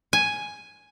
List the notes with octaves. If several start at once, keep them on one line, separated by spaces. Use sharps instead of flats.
G#5